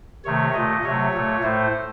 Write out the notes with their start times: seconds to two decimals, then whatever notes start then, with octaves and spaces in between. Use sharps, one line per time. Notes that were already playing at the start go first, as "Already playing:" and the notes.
0.24 C3 D#3 A3 C#5
0.54 A#2 A3 D#5
0.83 C3 F#3 A3 C#5
1.14 A#2 A3
1.43 A2 A3 C5